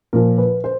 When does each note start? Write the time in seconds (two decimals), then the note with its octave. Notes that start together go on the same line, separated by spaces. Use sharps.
0.13 A#2 F3 A#4
0.38 B4
0.64 C5